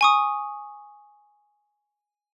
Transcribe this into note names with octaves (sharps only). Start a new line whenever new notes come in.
G#5 C#6 D#6